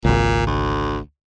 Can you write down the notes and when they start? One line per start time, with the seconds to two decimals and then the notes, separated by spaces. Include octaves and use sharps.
0.05 G#1 C#2 A#2
0.47 D2